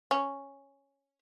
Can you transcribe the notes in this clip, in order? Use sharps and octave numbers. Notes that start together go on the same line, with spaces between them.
C#4